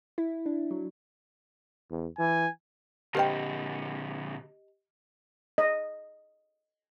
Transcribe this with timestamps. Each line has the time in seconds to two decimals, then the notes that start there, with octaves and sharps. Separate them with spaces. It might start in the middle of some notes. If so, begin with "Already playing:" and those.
0.18 E4
0.46 D4
0.71 F#3
1.90 E2
2.19 E3 G#5
3.15 A#2 D3 G4 A#4 C5 D#5 G5
5.58 D#5